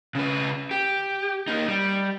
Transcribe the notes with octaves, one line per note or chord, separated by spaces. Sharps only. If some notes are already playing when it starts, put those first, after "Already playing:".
C#3 B4
G4
A#3 D#4
G3